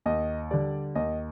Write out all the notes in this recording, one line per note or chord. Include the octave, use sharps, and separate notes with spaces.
D#2 D#5
D3 G3 D5
D#2 D#5